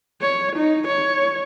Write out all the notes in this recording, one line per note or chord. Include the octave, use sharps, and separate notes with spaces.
C#5
D#4
C#5